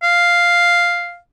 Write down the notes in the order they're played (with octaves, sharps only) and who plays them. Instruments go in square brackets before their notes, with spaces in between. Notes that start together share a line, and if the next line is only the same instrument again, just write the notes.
[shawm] F5